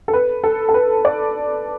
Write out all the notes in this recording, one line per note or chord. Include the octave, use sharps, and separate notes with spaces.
A4
B4
A4
A4
B4
D5